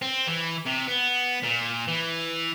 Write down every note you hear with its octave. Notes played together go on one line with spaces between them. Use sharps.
C4
E3
C3
B3
A#2
E3